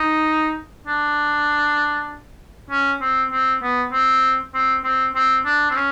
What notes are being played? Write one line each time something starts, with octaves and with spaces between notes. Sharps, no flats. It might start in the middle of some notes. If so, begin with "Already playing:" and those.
Already playing: D#4
D4
C#4
C4
C4
B3
C4
C4
C4
C4
D4
C4
C#4